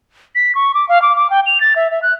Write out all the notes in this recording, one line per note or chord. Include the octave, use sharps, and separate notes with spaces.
B6
C#6
D6
F5
D6
D6
G5
F7
A6
E5
E5
F#6